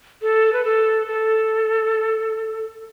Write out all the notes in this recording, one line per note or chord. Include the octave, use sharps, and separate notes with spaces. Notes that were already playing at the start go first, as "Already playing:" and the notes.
A4
B4
A4
A4